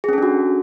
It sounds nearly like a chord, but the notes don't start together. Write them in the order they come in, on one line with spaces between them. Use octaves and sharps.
G#4 C#4 A4 D4 F#4